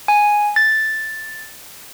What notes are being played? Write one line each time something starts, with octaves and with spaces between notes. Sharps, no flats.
G#5
A6